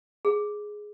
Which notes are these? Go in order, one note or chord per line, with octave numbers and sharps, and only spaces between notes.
G#4